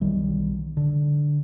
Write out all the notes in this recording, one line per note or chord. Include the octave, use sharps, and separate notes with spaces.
B1 D#3 E3 G3
D3